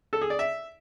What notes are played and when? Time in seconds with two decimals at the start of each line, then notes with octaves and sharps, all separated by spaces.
0.13 A4
0.21 G#4
0.30 D5
0.39 E5